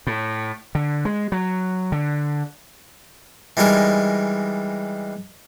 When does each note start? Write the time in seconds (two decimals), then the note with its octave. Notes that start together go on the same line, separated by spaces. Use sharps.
0.07 A2
0.75 D3
1.05 G#3
1.32 F#3
1.92 D3
3.57 E3 G3 G#3 D#4 A#4